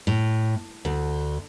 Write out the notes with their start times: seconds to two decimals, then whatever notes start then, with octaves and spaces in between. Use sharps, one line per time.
0.07 A2
0.85 D2